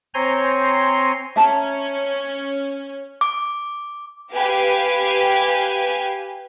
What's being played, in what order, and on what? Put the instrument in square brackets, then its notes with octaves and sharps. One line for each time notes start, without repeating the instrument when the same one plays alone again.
[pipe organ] C4 C5 C#5 G#5 A#5 C6
[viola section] C#4 [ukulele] E5 A5 A#5
[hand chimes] D6
[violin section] G4 B4 F5 G#5